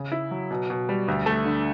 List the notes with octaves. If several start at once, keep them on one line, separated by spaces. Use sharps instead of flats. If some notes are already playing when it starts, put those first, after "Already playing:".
Already playing: C#3
E4
F#3
B2
B2
G3
D2
A3
D3